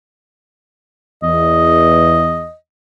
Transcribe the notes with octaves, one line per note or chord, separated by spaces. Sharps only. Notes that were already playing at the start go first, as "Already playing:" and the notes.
E2 D#5